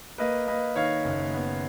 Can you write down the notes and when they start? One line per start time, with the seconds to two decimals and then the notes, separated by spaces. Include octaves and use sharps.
0.18 A#3 B4 D#5
0.47 A#3 B4 D#5
0.76 D#3 C#5 F5
1.04 F#1
1.34 B3